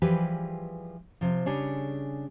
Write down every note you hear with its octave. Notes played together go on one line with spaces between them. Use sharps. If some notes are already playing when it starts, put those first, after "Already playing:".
E3 F3 G3 G4 G#4 B4
C3 F3
C#3 G3 D4 G#4 C#5